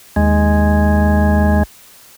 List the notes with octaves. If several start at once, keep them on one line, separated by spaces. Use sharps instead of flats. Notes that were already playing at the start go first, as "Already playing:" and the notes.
D#2 G#3